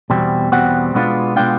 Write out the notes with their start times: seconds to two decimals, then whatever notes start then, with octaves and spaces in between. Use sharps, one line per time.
0.10 E2 B2 G3 C4
0.52 E2 B2 G3 C4 F#5
0.94 B2 G#3 B3 D4 F4
1.36 B2 G#3 B3 D4 F4 G5